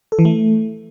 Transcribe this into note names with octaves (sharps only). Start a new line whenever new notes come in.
A4
E3
A3